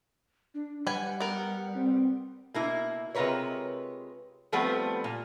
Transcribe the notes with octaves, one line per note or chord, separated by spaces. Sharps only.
D4
G3 B4 F#5 G#5
B3 A#4
C4
B2 A#3 E4
C3 G#3 F4 A#4 B4 C#5
F3 G3 A3 B3 C4 B4
A#2